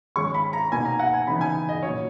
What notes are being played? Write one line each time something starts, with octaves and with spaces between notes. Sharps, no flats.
D#3 G#3 C#4 C#6
B5
A#5
B2 A#3 D#4 G#5
A#5
F#5
G#5
C#3 E3 B3 D#4 B5
G#5
D#5
A#2 F#3 C#4 C#5